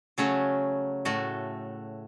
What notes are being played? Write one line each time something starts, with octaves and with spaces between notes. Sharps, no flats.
C#3 F#3 A3 C#4 F#4
A2 A3 F#4